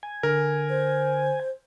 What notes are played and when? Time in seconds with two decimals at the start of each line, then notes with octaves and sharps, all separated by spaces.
0.03 G#5
0.23 D3 A#4
0.69 C5